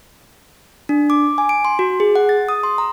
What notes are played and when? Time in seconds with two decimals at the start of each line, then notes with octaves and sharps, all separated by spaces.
0.89 D4
1.10 D6
1.38 G#5
1.49 D7
1.65 C6
1.79 F#4
2.00 G#4
2.15 F#5
2.29 A6
2.49 D#6
2.63 C6
2.78 A#5